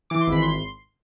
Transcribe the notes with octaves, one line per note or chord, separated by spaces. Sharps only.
E3 D6
C6
G#1 B5
C6